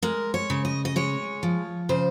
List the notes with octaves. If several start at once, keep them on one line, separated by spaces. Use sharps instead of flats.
G#3 A#4
C#5
C#3
D#5
D#5
G#3 C#5
F3
C#3 C5